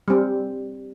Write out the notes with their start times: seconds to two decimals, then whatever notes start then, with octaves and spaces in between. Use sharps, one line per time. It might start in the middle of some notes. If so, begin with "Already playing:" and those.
0.08 G3 C4